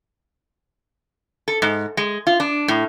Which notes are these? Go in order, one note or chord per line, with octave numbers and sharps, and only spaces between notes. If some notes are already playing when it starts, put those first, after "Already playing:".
A4
G#2
G#3
F4
D4
A2